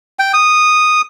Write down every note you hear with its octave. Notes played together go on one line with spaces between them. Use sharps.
G5
D#6